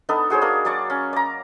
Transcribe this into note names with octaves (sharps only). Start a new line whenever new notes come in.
B3 D4 D#4 A4
F#4 G#4 C5 C#5
A#3 D4
F#3 D5 C#6
C#4
D5 A#5